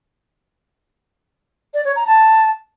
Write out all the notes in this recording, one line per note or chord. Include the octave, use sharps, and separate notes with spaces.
D5
C#5
A#5
A5